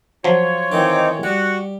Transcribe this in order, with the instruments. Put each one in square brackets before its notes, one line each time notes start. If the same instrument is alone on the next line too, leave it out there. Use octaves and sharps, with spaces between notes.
[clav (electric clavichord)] F3 F#3 [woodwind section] F4 C#5
[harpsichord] D#3 E3 [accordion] C4 D#4 D6
[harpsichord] G3 [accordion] F#4 F#5